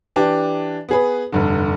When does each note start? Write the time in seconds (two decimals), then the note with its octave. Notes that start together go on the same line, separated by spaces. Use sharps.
0.16 E3 D4 G4
0.89 B3 G#4 B4
1.32 F1 G2 D3